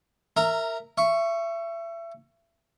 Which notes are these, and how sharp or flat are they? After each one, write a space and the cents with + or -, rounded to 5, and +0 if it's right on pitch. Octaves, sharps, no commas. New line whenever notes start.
A#4 -20 E5 +0 A#5 +0
E5 +30 C#6 +0